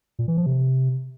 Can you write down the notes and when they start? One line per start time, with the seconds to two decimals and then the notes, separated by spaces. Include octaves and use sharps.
0.19 A#2
0.28 E3
0.37 F3
0.46 C3